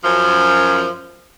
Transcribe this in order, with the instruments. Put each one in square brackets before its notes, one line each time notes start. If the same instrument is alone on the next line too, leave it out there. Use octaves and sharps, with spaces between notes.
[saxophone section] F#2 F3